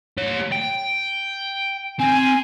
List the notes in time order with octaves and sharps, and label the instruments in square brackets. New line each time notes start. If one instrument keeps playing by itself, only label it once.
[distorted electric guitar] G4 C#5
G5
[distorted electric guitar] C4 [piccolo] G#5